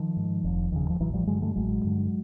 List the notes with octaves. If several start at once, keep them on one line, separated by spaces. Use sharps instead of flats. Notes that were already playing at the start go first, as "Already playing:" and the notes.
Already playing: D#3 F3
G#2
F1
D#2 C#3
F3
A1 E3 F#3
F3 G3
G2 D3 F#3 G#3
G3 A3
A1 F#3 G#3
G2 D3